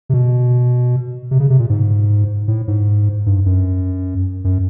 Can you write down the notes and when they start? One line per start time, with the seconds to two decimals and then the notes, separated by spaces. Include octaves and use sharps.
0.09 C3
0.14 B2
1.31 C3
1.40 C#3
1.50 C3
1.59 A#2
1.69 G#2
2.48 A2
2.68 G#2
3.26 G2
3.46 F#2
4.44 F#2